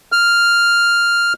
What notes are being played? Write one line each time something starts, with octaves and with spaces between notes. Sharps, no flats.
F6